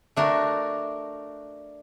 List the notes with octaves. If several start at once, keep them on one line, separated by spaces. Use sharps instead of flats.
A3 D4 F#4 A#4